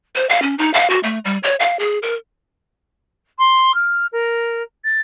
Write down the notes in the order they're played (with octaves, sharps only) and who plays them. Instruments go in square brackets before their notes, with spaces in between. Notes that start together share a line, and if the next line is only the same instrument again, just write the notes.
[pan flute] C5
F5
C#4
D#4
F5
F#4
A3
G3
C#5
F5
G#4
A#4
[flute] C6
F6
A#4
A6